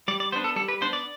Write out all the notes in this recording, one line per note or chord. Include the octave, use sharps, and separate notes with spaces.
G3 D5
D5
B3 D4 C5
A4
G3 A4
B4
B3 D4 C5
D5